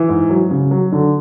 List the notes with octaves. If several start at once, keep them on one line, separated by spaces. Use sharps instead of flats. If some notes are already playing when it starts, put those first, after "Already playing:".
Already playing: E3
G#2
F#3
C#3
F#3
D3